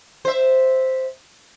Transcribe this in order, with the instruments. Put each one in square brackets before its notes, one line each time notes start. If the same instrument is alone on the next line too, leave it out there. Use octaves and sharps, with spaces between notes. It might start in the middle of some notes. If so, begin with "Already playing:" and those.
[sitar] C5 E5